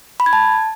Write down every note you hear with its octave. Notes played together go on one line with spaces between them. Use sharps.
B5
G#6
A5